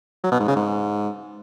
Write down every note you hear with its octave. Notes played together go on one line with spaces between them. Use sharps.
F#3
B2
G#2
C#3
G#2